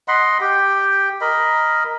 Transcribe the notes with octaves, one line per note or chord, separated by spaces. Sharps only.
D#5 F#5 B5 C6
G4 G5
A#4 D#5 B5